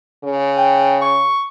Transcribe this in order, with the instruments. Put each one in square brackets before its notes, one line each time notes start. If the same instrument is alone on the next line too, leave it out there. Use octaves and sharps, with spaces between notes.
[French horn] C#3
[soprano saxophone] G5
C#6